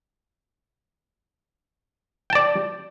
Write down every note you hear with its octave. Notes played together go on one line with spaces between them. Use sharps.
D5 G5 A5